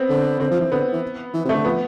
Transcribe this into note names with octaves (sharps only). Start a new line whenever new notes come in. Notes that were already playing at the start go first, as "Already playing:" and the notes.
Already playing: B3 C4
D3
D3 C4
F3
E3
D3 B3
E3
E3
C3
A3
D3
F3 B3